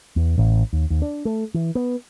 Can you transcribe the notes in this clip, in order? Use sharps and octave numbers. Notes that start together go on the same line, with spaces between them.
E2
A1
D#2
D#2
D4
A3
E3
B3